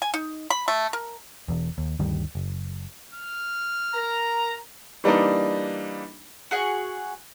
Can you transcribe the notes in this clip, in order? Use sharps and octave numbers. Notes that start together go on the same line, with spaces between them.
G#5
D#4
B5
A3
A#4
E1 E2
D#2
D2 G2 D#3 G3
F#1
F6
A#4 A#5
E3 G3 A#3 D4 D#4
F#4 G#4 F#5